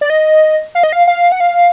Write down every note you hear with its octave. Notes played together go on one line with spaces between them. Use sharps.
D5
D#5
F5
D#5
F5
F5
F#5
F5